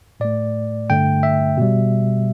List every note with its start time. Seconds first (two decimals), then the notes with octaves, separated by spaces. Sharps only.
0.20 A2 A3 D5
0.90 G2 D3 A3 G5
1.23 E5
1.57 B2 G3